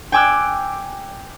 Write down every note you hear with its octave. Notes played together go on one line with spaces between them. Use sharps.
G5 G#5 D6 E6 F#6